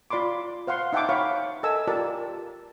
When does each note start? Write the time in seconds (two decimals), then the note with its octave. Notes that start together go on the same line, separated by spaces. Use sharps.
0.10 F4 D5 B5 C6 D6
0.67 C5 F5 F#5 C6
0.93 D#4 E5 F#5 G5 A5 D6
1.09 C#5 E5 F5 B5 C#6
1.63 A4 A#4 D#5 G#5 E6
1.87 F4 G4 A#4 D5 A5